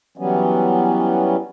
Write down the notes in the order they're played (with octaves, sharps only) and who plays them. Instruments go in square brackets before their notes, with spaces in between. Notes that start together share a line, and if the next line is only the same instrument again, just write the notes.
[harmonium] E3 F#3 G3 B3 C#4